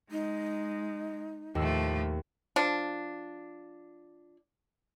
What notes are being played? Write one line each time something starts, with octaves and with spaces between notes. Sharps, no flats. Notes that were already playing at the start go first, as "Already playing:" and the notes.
G#3 D#4
D#2 A2 F3 A3 E6
F3 D4